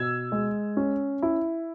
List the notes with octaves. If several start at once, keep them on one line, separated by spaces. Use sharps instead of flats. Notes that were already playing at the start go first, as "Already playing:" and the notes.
Already playing: B2 E6 G#6
G#3
C#4
E4